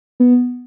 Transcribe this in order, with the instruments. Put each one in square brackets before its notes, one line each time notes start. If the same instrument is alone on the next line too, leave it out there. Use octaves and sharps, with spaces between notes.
[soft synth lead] B3